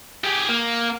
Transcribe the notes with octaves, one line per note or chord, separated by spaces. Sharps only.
G4 G#4
A#3